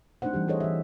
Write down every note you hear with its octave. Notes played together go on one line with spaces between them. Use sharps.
A3 C4 D4 D#4 C5 F#5
E3 G3 G4
G#4 A4 C5 C#5 D#5
E3 G4 E5